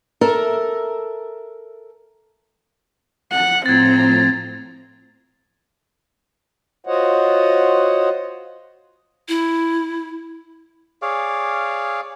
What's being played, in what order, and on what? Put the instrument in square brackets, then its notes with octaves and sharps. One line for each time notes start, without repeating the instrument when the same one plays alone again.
[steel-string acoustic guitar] A4 A#4 E5
[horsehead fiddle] F#5
[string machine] A2 F3 A#5 [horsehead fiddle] C4 [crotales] G#6 A6
[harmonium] F4 F#4 C5 C#5 D#5 F#5
[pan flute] E4
[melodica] G#4 C#5 D5 F5